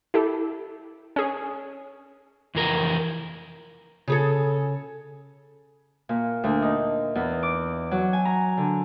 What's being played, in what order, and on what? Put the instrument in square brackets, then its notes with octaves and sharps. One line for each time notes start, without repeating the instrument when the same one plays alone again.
[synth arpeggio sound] E4 G4 A4
C#4 G#4
[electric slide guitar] F2 E3 A#4
[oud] C#3 G#4 A4
[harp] A#2
D2
D#4
E2
D6
F#3
G#5
A#5
D3